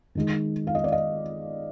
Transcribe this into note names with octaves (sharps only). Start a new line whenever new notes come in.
D#3 G#3 D#4
F5
D#5
D5
D#5